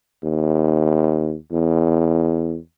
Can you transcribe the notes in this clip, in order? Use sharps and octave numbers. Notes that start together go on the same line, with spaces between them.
D#2
E2